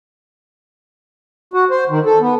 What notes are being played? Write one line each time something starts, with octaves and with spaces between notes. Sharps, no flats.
F#4
C5
D#3
A4
B3